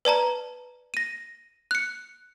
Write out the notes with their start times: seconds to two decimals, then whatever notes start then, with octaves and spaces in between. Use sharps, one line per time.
0.05 B4 D5 A5 A#5
0.94 A#6 D#7
1.71 F#6 C#7